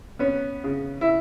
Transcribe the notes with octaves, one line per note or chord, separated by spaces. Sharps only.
B3 C#4
C#3
E4